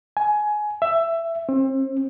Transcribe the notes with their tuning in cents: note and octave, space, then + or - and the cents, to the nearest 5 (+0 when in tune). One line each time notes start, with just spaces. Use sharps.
G#5 +20
E5 +15
C4 +35